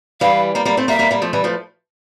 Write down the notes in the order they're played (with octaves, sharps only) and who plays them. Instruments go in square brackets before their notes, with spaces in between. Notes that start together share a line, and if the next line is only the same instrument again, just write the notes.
[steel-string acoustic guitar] E3 G3 [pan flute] F5
[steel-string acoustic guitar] G3 A#3
G3 A#3
A3 C4
[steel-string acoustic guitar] G3 A#3 [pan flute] E5
[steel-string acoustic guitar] G3 A#3
G3 A#3
F3 A3
E3 G3
F3 A3